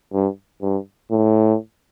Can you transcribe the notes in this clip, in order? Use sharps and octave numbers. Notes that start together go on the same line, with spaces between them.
G2
G2
A2